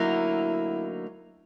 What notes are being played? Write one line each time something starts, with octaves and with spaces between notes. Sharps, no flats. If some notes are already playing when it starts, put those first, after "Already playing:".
Already playing: D2 D3 F#3 A#3 D#4 E4